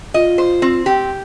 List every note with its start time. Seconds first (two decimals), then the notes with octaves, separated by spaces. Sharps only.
0.14 F4 D#5
0.38 C5
0.62 C4
0.86 G4